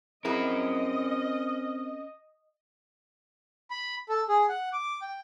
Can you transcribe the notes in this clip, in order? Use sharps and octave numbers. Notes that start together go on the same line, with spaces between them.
C4 C#4 E4 G#4 A#4 B4 D#5
B5
A4
G#4
F#5
D6
G5